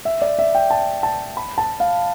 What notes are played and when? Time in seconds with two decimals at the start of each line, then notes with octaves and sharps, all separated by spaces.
0.05 E5
0.22 D5
0.39 E5
0.55 G5
0.71 A5
1.03 A5
1.37 B5
1.58 A5
1.80 F5